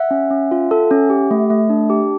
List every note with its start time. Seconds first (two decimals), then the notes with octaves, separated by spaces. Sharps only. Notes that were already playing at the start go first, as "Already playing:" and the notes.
Already playing: E5 F#5
0.11 C#4
0.30 C#4
0.51 F4
0.71 A4
0.91 C#4
1.10 G4
1.31 A3
1.50 A3
1.70 D4
1.90 G4